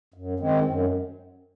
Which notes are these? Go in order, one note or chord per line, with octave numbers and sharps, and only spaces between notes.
F#2
D#3 G#3 C4
F#2